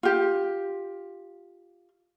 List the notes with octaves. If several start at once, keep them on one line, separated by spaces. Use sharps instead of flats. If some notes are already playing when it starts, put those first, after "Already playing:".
F4 G4